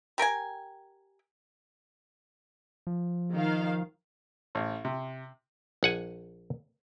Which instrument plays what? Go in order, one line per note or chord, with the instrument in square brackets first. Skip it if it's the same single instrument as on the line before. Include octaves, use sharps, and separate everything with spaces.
[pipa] G4 A#4 G5 G#5
[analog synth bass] F3
[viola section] D#3 F5
[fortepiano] A1
C3
[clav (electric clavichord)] A#1 F#5 G#5